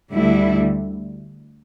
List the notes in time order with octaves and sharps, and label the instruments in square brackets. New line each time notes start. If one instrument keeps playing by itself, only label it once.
[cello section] D2 D3 G3 E4